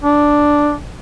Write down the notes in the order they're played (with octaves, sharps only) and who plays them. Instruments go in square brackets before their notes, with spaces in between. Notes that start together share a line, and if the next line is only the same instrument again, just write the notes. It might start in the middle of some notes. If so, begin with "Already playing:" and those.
[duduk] D4